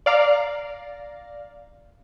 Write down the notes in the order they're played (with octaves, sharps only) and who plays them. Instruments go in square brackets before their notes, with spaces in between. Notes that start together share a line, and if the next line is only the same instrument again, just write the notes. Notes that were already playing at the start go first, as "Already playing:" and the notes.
[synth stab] D5 F5 A#5